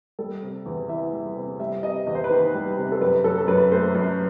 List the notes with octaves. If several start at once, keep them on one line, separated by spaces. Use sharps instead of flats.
G3 A4
C3
E2
E3 E5
G3
C3
G3 E5
C3 D#5
E2 D#5
C5
B4
D#3 C5
G3
C3
A4
F#2 B4
F#3 A4
A4
F#2 B4
A3 C5
F#2